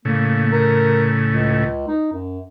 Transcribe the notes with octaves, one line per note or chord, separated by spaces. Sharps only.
A2 C#3 A#3
A#4
C#2
D#4
F#2